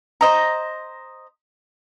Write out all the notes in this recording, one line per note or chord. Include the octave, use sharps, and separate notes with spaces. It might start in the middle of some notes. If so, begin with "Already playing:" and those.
C5 D#5 A#5